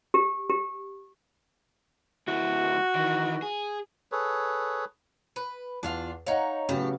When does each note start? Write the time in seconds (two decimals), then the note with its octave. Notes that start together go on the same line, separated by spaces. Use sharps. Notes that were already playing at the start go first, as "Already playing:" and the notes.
0.14 G4
0.50 G4
2.28 D2 E4 F#4
2.95 D#3 E3
3.42 G#4
4.12 G#4 A4 B4 C#5
5.36 B4
5.83 E2 D4 F4 F5
6.26 D#4 C#5 F5 F#5
6.69 A2 C#3 F#3 B3 G4